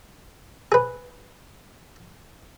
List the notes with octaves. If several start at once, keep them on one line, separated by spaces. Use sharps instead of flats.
G#4 B4